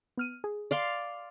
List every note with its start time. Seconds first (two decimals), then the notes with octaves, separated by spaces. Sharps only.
0.17 B3 F6 D#7
0.44 G#4
0.71 D5 F5 C6